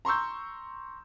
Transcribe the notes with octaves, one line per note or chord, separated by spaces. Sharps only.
A#5 C6 C#6 E6 G6